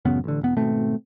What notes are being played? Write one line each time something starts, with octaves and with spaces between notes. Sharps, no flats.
A1 F#2 C#3 B3
A1 D3
E1 B3
G#1 B2 A3 C4